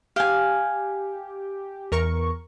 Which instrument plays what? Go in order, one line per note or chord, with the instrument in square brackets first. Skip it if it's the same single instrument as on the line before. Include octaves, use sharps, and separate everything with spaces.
[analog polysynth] G4 [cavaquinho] F5 G#5
[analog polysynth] E2 A#4 C#6